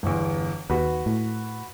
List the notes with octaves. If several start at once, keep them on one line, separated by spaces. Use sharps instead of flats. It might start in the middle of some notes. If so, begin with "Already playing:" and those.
G1 E2
D#2 F#4 B4
A2